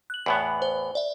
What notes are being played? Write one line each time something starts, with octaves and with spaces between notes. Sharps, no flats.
F#6 F#7
E2 A2 B3
C5
D5 E5